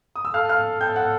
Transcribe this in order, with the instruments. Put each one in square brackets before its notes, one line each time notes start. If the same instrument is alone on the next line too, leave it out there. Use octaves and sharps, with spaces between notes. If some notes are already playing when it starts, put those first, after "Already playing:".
[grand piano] D#6
E6
[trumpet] A4 [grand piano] F5 F6
[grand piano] F5 F6
[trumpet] A4 [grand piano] G5 G6
[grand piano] F#5 F#6